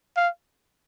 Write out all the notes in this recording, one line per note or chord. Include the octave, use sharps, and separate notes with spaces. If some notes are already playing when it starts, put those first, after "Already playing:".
F5